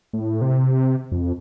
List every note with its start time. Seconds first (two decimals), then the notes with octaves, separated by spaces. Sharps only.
0.13 A2
0.42 C3
0.71 C3
1.12 F2